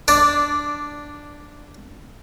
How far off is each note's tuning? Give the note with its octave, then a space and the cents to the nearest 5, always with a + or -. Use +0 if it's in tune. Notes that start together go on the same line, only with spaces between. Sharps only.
D4 +0 D5 -10